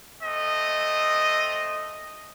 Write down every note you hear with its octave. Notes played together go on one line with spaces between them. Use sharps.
A3 C4 D#5